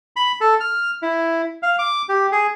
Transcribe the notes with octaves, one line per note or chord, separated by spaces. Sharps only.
B5
A4
F6
E4
F5
D6
G4
G#4